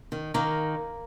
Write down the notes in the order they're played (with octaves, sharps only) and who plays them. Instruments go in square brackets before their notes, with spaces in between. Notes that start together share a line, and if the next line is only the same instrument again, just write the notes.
[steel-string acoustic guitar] D#3
[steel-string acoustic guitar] D#3 [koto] A#3